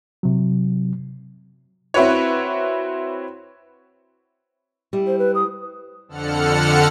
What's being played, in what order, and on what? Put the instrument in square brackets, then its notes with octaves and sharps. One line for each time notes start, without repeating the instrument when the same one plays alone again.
[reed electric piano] C3 F#3
[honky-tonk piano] C4 E4 F#4 B4 C#5
[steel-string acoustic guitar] G3 E4
[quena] C5
B4
D#6
[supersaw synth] F2 D3 A4 F#5 F6 C#7